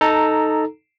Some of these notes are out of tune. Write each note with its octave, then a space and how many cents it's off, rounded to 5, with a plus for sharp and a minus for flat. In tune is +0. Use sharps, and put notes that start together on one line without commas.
D#4 +0 A4 +0 A#5 -10